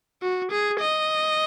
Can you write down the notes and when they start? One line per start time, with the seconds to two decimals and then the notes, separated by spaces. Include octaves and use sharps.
0.22 F#4
0.51 G#4
0.80 D#5